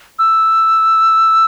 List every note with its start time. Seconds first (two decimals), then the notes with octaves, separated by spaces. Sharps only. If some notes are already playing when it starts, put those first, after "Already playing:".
0.19 E6